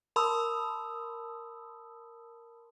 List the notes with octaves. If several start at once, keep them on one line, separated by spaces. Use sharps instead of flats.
A#4 A5 B5 C6 D#6 E6